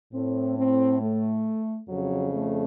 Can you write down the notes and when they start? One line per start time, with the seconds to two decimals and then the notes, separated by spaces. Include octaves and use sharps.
0.14 A2 C4
0.58 C4
1.02 A3
1.88 F2 C#3 F#3
2.33 A3